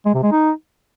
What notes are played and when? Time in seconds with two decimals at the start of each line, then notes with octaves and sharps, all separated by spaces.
0.06 G#3
0.14 C3
0.23 G#3
0.32 D#4